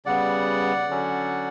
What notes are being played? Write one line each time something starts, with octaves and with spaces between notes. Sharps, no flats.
C#3 G3 B3 D5 F#5
D3 F#3 C#4